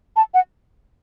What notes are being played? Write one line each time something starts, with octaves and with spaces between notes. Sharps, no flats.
A5
F#5